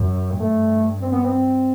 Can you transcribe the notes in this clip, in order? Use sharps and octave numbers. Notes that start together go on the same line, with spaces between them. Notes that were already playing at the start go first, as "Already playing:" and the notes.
Already playing: F#2
G2 A3
C4
B3
C4